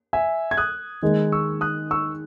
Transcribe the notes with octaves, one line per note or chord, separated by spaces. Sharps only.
E5 G#5
G#6
D#6 F#6
D#3 G#3 D#4
C#6 E6
D#6 F#6
C#6 E6